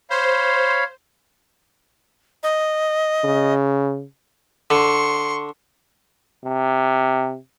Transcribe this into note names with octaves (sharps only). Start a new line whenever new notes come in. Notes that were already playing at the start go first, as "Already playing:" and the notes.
C5 C#5 F5 B5
D#5
C#3
D3 C6 C#6
C3